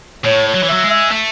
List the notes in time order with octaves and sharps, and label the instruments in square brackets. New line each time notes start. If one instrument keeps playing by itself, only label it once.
[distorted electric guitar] A2 [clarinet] C#5
[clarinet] C#5
[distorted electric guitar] F#3
E3
[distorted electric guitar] F#3 [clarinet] E5
[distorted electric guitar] G#3
[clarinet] E5
[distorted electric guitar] A3